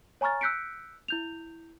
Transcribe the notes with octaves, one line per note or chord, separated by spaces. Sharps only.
C#5 G#5 A#5 C#6 F6 A6
E6 F#6 G6 B6 C#7 D7
E4 G6 F7